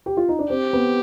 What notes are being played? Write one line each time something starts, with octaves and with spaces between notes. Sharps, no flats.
G4
F4
D#4
D4
C4 G4
B3